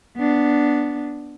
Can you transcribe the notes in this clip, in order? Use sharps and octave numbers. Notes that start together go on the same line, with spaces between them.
B3 D4